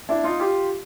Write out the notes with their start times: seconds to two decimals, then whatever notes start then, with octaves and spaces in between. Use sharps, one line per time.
0.09 D4 E4
0.24 D#4 F4
0.40 F4 G4